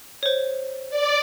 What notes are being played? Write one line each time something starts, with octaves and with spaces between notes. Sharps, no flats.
C5 C#5
D5